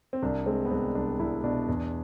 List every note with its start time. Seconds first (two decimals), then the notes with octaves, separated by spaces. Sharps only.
0.13 C4
0.23 C2 D4
0.46 G#3 C4
0.65 B3
0.71 C2 C4
0.95 C2 D4
1.20 C2 E4
1.44 B2 D4
1.68 E2